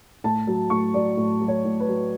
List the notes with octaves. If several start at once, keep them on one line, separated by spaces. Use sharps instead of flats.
A2 A5
F#3
A2 C#6
F#3 D5
A2
F#3
C#5
A2
B4
F#3